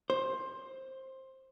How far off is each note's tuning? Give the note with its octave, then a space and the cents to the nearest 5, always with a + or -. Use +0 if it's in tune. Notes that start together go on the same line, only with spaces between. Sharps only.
C5 +15